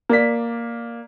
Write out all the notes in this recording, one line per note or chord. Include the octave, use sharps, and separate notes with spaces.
A#3 D5 B6